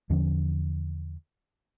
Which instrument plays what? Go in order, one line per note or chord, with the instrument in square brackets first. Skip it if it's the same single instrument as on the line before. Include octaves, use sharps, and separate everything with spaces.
[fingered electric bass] E2 D3 F3 C#4